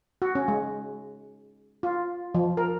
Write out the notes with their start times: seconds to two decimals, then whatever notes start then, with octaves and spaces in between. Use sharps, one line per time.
0.22 F#4
0.35 C#4
0.48 G#3
1.83 F4
2.35 F3
2.57 A#4